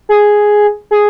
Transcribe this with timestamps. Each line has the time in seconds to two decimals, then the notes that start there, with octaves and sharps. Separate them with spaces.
0.09 G#4
0.91 G#4